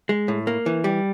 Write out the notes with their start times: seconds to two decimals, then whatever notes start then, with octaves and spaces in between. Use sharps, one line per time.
0.09 G#3
0.28 A2
0.47 A#3
0.66 E3
0.84 G3